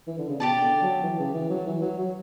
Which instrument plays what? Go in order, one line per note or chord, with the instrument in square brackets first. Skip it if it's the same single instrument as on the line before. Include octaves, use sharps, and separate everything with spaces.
[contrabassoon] E3
D3
C#3
[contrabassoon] B2 [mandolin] G4 D5 A5
[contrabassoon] D3
F#3
E3
C#3
E3
F#3
E3
F#3
F#3